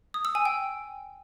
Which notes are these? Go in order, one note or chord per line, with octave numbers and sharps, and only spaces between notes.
D#6
E6
G#5
G5